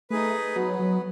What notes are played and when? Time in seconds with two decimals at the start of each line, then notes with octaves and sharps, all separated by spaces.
0.10 A3 D#4 G#4 B4
0.56 F#3 B3
0.79 F#3